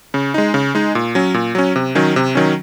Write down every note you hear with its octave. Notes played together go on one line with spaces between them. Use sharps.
C#3
G#3 D#4
C#3
G#3 D#4
A#2
F#3 C#4
A#2
F#3 C#4
C3
D#3 F#3 C#4
C3
D#3 F#3 C#4